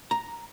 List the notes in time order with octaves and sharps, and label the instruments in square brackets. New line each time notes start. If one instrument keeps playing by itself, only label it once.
[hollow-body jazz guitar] A#5